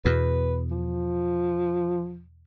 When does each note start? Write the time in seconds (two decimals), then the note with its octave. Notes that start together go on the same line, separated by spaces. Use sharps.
0.05 E2 B2 B4
0.71 F3